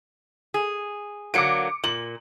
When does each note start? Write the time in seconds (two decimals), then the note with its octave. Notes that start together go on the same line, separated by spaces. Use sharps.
0.54 G#4
1.34 D3 F#3 A#3 D6 C#7 D7
1.84 A#2 F#7